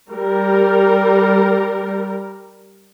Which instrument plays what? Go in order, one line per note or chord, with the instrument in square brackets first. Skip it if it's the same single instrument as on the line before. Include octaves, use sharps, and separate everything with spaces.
[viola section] G3 A#4